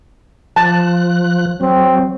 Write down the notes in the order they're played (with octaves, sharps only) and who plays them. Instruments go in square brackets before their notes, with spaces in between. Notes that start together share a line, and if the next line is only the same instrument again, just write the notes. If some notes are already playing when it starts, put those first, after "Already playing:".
[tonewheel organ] F3 F#6 [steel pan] A5
[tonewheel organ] F#3 [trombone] C4